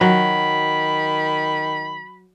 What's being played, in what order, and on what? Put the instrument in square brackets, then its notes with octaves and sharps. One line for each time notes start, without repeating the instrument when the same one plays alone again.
[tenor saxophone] D#3 [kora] F#3 [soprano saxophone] B5